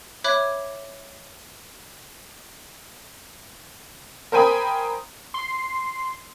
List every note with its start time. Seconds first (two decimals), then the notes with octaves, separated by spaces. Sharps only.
0.24 C#5 E5 B5 D6 F#6 G#6
4.32 A#4 C5 G5 G#5 B5 D#6
5.34 C6